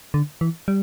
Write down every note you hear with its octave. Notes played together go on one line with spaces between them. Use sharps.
D3
E3
G3